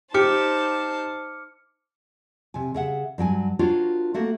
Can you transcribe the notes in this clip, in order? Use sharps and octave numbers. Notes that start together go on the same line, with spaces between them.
D#4 G4 C5 A5 D6 F6 C#7
C3 G#5
C#3 E5 F#5
G2 F#3 G5 G#5
D4 F4 F#4 A#4 C5 C#5
A3 A#3 F#4